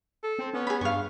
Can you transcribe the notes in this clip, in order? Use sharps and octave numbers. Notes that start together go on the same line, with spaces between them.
A4
C4
B3 C#4
G#4 B5
G2 F5 C#6